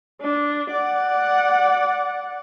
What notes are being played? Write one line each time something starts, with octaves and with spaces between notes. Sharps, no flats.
D4
D5 F#5